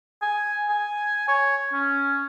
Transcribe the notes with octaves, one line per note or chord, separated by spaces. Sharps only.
G#5
G#5
C#5
C#4